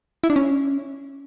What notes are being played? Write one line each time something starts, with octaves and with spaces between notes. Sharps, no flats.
E4
D4
C#4